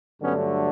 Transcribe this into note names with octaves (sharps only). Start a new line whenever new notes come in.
G2 D3 F#3 A3 B3 C#4